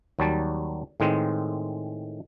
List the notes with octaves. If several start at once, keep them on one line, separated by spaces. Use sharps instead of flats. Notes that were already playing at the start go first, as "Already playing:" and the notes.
D#2 F#3 G3 A5
A2 D#3 G#3 C4